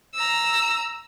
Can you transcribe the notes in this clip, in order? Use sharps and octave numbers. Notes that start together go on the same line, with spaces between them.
A#5 E6